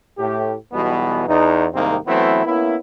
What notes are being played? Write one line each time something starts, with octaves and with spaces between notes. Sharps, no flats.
A2 G4
B1 B2 E3 G3 B3
E2 D#4
C2 G#2 D#3 A#3 C4 D#4
E3 F#3 A3 B3 C4 E4
A#3 B3 C#4 E4